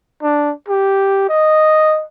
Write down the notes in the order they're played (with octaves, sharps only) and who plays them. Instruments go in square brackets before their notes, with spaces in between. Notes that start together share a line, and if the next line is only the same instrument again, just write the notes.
[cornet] D4
G4
D#5